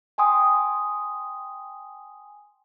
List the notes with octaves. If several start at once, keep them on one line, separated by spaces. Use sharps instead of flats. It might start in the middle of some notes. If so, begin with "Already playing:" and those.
G5 G#5 C6 D#6